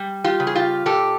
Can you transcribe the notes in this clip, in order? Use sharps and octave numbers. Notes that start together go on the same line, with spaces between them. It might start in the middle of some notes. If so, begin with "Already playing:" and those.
Already playing: G3
F4 G4
C#3
G#4
F4 G4
A#2 G4 A4